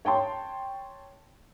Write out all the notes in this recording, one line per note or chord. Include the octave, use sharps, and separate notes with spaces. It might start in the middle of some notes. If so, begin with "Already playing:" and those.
C#5 G5 A5 C6